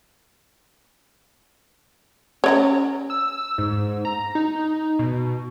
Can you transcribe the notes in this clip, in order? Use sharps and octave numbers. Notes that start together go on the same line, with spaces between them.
C#4 C#5 D5 A#5
E6
G#2
A#5
D#4
B2